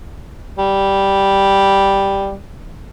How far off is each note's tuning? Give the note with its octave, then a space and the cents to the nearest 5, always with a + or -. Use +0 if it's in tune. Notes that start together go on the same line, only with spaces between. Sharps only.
G3 +0